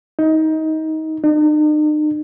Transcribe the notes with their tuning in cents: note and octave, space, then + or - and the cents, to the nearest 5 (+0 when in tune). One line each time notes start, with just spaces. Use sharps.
D#4 +20
D#4 -45